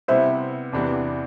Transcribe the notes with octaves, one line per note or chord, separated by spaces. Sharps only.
C3 G3 B3 E4 C5 E5
E2 C3 E3 B3 D4